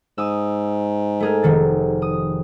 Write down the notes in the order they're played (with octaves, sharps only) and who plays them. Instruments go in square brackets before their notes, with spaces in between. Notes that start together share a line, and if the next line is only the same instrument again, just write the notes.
[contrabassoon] G#2 [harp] D#6 E6
[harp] A3 G#4 A#4
F1 D#3 A6
D#6